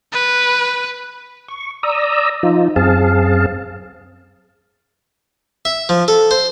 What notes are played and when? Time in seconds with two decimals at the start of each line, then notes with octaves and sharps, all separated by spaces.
0.12 B4
1.48 C#6
1.83 D5 A#5 D#6 E6
2.43 F3 D#4 F4
2.76 F#2 C4 G#4 F5 A5
5.65 E5
5.89 F3
6.08 A4
6.31 C5